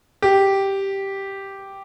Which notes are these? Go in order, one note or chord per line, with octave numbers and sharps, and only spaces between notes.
G4